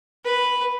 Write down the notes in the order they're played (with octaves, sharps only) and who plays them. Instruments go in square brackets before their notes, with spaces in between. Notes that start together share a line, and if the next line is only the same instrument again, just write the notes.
[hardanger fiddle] B4